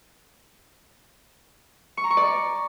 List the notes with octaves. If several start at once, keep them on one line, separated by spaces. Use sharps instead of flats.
C#6
A#5
C#6
D5